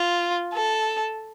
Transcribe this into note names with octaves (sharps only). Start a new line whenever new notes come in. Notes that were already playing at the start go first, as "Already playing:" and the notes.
Already playing: F4
A4